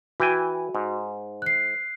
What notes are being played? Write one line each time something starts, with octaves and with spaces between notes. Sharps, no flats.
E3 F#4 G5 G#5
G#2
F#6 C7